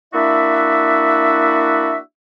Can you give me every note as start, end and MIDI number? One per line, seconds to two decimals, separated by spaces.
0.13 1.98 58
0.13 1.98 62
0.13 1.98 64
0.13 1.98 66
0.13 1.98 74
0.13 1.98 76